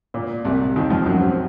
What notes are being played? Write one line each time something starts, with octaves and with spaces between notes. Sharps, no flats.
A#2
C2 C3
D#2 D#3
F2 F3
F#2 F#3
C3 C4